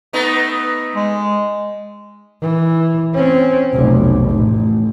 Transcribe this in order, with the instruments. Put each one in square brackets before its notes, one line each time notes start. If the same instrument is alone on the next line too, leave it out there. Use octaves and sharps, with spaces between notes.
[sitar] A3 B3 D#4
[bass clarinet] G#3
[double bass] E3
C4 C#4
F1 B1
A1